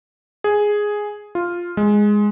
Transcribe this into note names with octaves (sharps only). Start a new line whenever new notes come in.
G#4
F4
G#3